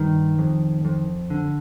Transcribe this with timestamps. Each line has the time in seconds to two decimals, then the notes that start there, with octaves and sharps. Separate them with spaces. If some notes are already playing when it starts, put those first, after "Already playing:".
Already playing: G2 D#3
0.39 F2
0.85 F2
1.30 D3